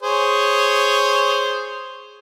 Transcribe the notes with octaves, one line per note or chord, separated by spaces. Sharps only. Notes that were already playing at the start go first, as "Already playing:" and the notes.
G#4 C5 C#5